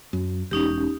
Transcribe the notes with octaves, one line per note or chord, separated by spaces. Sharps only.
F#2
E1 C#4 D#4 G4